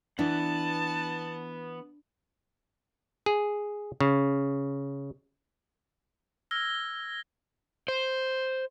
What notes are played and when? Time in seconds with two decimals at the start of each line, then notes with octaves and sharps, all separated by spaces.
0.19 E3 B3 D4 F#5 A5
3.26 G#4
4.01 C#3
6.51 E6 F6 G#6 A#6 G7
7.88 C5